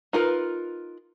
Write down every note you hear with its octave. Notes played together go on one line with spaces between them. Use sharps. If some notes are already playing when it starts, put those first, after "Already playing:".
D#4 F4 A#4 B4